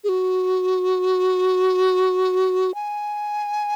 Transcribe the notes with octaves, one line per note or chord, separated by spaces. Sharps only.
G#4
F#4
G#5